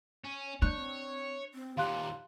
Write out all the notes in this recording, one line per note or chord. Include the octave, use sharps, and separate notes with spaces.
C#4
D4 C#5 F#6 G6
C4
C4
D#2 A#2 G4 F5 C6 F#6